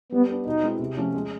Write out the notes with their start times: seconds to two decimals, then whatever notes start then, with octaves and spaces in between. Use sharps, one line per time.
0.12 G3 B3
0.29 B3 D4
0.46 B2 D#4
0.63 G#3 C4 E4 G#4
0.80 C3
0.97 F3 A3 C#4
1.14 G#3